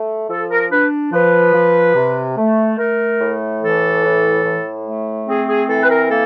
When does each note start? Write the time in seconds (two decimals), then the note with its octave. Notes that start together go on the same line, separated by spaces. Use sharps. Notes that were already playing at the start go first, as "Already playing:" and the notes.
Already playing: A3
0.29 F3 A4
0.50 A#4
0.71 D4 B4
1.13 F3 B4
1.54 F3
1.96 C3
2.37 A3
2.78 A3 A#4
3.21 A2
3.62 E3 A4
4.04 A2
4.45 A2
4.86 A3
5.28 C4 G#4
5.49 G#4
5.69 E3 A4
5.83 B4
5.90 A#4
6.10 A#3 A4